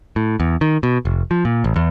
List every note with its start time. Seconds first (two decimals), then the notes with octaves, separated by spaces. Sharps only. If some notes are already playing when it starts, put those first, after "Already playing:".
0.16 A2
0.40 E2
0.61 D#3
0.83 B2
1.05 F1
1.31 F3
1.45 A#2
1.64 A1
1.76 E2